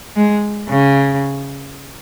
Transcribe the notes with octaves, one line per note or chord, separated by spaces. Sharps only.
G#3
C#3